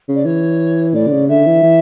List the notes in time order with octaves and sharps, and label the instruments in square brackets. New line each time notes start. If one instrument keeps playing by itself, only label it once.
[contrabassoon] C#3
[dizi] D5
[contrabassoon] E3 [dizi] C#5
[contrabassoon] A2 [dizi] D5
[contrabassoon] D3
C#3
[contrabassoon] D3 [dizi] E5
[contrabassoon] E3
E3